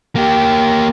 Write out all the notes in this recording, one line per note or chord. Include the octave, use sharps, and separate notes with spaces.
A#3 G4